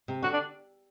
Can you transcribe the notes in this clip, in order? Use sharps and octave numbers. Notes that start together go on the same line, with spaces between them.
C3
D3 F#4
D4